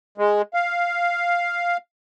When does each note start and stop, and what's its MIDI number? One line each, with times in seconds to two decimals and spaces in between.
0.18 0.42 56
0.54 1.77 77